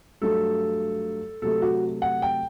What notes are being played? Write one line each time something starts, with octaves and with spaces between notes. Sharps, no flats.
G2 F#3 A3 A4
C3 F#3 A3 A4
F#4
F#5
G5